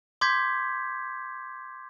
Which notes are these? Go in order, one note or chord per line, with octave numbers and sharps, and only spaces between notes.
C6 D6 G6 G#6 B6